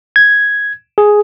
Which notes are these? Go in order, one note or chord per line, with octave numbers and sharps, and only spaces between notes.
G#6
G#4